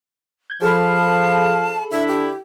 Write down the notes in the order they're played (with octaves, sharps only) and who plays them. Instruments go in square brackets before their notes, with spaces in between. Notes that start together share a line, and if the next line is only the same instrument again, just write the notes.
[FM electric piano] G6 G#6
[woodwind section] F3 F5 [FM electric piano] G#4 A4 B5 [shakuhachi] A5
[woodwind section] D3 D4 E4 [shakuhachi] E5
[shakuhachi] G4